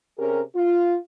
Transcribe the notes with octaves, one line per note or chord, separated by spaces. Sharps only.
C3 C#4 G4 G#4 A#4
F4